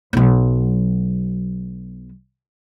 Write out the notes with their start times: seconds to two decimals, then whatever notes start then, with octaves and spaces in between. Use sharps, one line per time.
0.13 B1 F#3